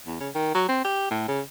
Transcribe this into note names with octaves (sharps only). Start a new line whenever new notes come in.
E2
C#3
D#3
F#3
C4
G4
A2
C#3